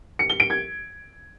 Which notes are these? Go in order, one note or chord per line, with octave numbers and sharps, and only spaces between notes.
C#7
G7
D7
G#6